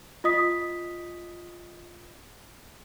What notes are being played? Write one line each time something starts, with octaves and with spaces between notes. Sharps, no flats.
F4 D#5 D#6 B6